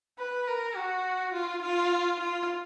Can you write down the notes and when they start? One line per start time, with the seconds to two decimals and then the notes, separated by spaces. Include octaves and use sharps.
0.19 B4
0.47 A#4
0.76 F#4
1.33 F4
1.62 F4
2.19 F4